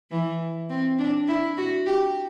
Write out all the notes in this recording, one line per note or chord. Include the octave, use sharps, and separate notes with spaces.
E3
C4
D4
E4
F#4
G4